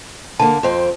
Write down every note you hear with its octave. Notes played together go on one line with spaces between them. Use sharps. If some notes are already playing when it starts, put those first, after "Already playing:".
D3 A#3 A5
F2 C4